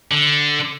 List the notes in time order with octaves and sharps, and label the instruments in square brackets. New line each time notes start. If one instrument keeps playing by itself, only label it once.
[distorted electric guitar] D3